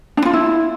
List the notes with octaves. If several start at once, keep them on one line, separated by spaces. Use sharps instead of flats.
D4
F4
E4